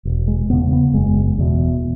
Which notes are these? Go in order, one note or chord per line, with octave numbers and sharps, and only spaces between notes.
E1
G#3
E2 C#3 B3
B3
F#1 G#3
E2 B2